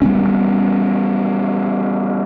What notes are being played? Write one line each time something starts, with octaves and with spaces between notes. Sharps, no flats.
G3 A3 B3 C#4